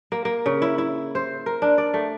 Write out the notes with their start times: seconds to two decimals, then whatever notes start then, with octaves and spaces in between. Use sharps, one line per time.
0.12 A#3
0.25 A#3
0.46 C#3
0.62 E4
0.78 E4
1.15 C5
1.46 A#4
1.62 D4
1.78 D5
1.94 A3